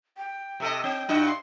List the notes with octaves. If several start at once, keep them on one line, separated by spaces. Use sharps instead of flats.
G5
C3 A4 D#5
C4 G5
G2 D4 F#4
C6